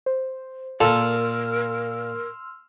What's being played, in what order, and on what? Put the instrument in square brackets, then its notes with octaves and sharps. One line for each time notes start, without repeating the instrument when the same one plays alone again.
[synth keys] C5
[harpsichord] A#2 [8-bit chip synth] A4 [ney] A#4 [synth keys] C6 E6 F6